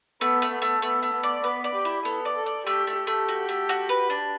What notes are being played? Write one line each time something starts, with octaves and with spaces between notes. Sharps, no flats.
A3 B3
A3
B3
A3
A3 B3
A3
B3
D5
B3 B4
D5
G4
E4
B3 A4
D5
A4
D5
A3 G4
A3
G4
A3
F#4
A3
F#4
B4
D4